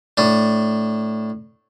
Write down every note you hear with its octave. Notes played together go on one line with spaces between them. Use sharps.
A2 D4